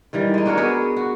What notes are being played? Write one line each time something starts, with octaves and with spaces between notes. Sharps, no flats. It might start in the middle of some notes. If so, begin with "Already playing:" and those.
D#3 E3 G3
G#3 D#4
D4 F#4 A#4 C#5
B3 F#4 G#4 A#4
F#4